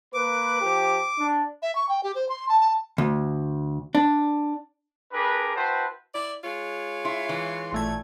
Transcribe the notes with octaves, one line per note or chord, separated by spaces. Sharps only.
A#3 B4 D6
F3 G4
D4
E5
C#6
G5
G4
C5
C6
A5
A5
D2
D4
D4 G4 G#4 A#4 B4
E4 F#4 B4 C5 G5 A5
E4 D5
G#3 F4 C#5
E4 C6
E3
A1 A#2 A3 G#6